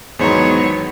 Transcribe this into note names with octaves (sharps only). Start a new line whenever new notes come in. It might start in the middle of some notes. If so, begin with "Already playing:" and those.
E2 G#2 D#3 F#3 B3 C5 C#5 A#5